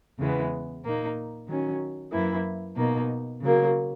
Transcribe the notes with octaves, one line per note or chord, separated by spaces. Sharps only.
E2 C#3 E3 G#3 B3
A#2 A#3 D#4
D#3 F#3 C#4
F#2 E3 A#3 E4
B2 A#3 D#4
C#3 F#3 A#3